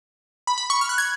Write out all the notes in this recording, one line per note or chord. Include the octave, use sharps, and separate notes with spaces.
B5
B5
C#6
F6
F#6
G#6